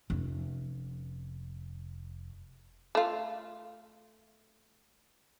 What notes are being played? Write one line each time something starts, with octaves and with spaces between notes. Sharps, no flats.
F1 C#4
A3 F4